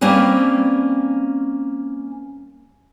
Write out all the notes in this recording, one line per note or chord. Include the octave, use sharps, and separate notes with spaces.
G3 A#3 C4 C#4 B4